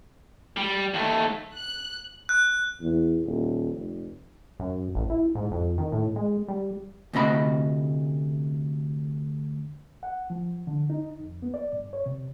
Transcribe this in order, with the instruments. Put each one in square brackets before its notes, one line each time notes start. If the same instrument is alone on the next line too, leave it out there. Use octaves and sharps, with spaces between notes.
[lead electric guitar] G3
D#2 A3
[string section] F#6
[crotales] F#6
[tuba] E2
D#1
F1
[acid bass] F#2
A1
E4
G#2
F2
D#3
A2
G#3
G3
[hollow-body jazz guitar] D2 C3 D#5 B5
[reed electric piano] F#5
F3
D3
D#4
F2
B3
D5
G2
C#5
C3